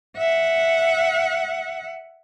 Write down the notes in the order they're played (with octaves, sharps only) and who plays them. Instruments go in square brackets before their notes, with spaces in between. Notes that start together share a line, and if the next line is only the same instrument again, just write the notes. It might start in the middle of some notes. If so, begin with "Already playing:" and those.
[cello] E5 F#5